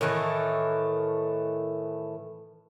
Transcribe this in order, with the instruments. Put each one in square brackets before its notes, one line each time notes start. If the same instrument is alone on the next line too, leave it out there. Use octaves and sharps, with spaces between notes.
[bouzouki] A2 D#3 E3 A3